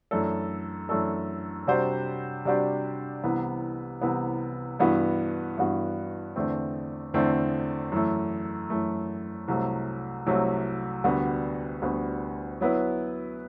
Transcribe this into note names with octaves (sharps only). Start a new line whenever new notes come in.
F#2 E3 A3 D4 A4
F#2 E3 A3 D4 A4
C3 G3 D4 F#4 C5
C3 G3 D4 F#4 C5
C2 C3 E3 B3
C2 C3 E3 B3
G2 E3 B3 F#4
G2 E3 B3 F#4
E2 D3 A3 C4
E2 D3 A3 C4
F#2 E3 A3
F#2 E3 A3
C2 C3 F#3 A3
C2 C3 F#3 A3
D2 D3 G3 B3 F#4
D2 D3 G3 B3 F#4
F#3 B3 E4 B4